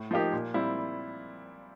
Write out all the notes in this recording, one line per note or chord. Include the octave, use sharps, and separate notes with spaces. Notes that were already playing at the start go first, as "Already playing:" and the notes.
Already playing: A2
F3 A#3 D#4 G4
A#2
G3 C4 E4